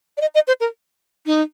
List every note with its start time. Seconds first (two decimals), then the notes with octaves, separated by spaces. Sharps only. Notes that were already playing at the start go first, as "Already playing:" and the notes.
0.17 D5
0.21 D#5
0.35 D#5
0.48 C5
0.61 A#4
1.26 D#4